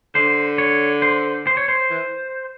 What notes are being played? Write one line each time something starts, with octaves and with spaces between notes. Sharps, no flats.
D3 C5
C#5
C5
C5
C#5
C5
E3